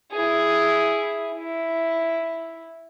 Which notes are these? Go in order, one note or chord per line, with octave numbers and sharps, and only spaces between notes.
E4 G#4
E4